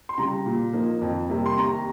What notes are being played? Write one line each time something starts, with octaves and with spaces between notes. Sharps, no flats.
C6
C#3 G3 A#5
A#2
F3 A#3 D#4
F2
C3 G3 A#3
C6
D#2 A#5